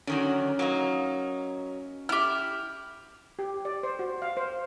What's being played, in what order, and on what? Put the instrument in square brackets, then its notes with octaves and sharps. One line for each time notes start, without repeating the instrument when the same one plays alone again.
[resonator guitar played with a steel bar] D3 D#3 F#3 [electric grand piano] C#4
[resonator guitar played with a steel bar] F#3 A#3 D#4
[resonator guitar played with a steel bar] E4 [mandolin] G4 F6
[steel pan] G4
D5
C5
F#4
F5
C5